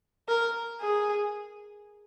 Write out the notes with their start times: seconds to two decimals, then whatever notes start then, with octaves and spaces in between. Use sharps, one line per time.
0.29 A#4
0.81 G#4